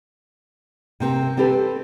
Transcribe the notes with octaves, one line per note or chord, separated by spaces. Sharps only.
C3 C4 A#4
C4 G4 A4 B4